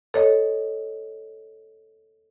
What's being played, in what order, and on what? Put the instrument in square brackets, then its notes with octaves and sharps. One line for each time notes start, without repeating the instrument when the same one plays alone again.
[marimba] A4 C#5 D#5